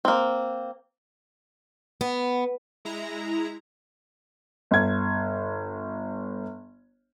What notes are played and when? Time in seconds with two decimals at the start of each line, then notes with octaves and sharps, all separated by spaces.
0.05 A#3 C4
2.01 B3
2.85 G#3 E4 A#5
4.71 G1 G#6